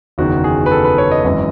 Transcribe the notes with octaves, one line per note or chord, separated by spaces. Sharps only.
F#1 E2 D#3 F#4
G#4
B4
A4
B4
C#5
D#5
G#1 F#2 E3